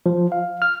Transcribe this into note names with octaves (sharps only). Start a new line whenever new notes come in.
F3
F5
F6